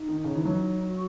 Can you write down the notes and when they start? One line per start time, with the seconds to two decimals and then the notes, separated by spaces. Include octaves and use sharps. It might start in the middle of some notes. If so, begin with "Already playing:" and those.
Already playing: D#4
0.08 D#3
0.24 C#3
0.36 E3
0.45 F#3
0.89 F#4